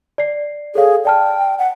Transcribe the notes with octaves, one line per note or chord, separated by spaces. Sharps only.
D5 C7
G#4 A4 C#5 F5
D5 G5 A5 F6
F#5